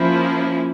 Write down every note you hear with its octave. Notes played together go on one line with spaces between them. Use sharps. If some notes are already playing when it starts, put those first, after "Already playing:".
Already playing: F3 A#3 C#4 E4